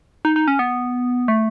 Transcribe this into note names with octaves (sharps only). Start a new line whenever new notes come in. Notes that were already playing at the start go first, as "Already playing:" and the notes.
D#4
D#4
C#4
B3
A3